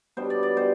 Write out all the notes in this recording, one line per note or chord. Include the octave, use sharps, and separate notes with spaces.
B2 G3 B3 D4 C5
D5
D5
B2 G3 C5